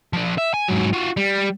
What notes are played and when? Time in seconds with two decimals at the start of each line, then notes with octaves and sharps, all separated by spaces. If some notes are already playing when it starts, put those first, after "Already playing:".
0.13 F3 D4
0.38 E5
0.54 G#5
0.68 G#2 F#3
0.93 F4 F#4
1.17 G3